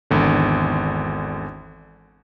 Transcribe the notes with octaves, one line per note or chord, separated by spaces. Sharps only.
G#1 E2 D3